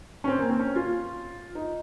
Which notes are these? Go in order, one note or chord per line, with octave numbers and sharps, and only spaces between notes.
C#4
C4
A#3
C4
C#4
F4
D#4